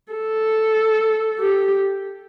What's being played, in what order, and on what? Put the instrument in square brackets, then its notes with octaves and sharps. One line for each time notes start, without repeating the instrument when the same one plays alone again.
[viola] A4
G4